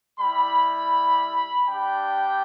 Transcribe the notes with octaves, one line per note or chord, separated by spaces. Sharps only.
G3 E4 G4 B5
G3 D4 G4 G5